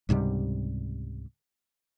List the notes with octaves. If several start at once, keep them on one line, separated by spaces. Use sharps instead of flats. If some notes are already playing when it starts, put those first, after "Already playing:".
C#2 G#2 C3 G3